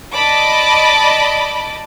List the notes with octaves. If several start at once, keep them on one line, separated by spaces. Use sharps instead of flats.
D5 D#5 A5 B5 D6